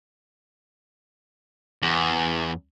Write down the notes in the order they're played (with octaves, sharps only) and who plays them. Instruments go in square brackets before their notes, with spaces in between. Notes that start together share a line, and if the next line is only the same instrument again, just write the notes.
[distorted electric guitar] E2